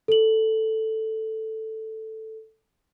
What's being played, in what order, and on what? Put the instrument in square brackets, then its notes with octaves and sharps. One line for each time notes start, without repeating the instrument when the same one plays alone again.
[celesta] A4 F#7